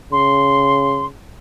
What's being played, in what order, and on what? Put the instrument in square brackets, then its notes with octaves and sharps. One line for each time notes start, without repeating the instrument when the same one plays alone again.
[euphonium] C#3 [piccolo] C6